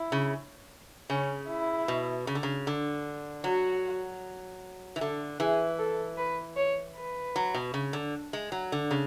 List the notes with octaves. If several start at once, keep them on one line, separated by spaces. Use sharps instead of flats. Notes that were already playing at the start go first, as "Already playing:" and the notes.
Already playing: E4
C#3
C#3 C#4
E4
B2
C#3
D3
C#3
D3
F#3 F#4
E3
D3 A4
E3 G#4
A4
B4
C#5
B4
F#3
B2
C#3
D3
G#3
F#3
D3
C#3